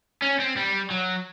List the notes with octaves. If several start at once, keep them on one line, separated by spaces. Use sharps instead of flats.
C#4
C4
G3
F#3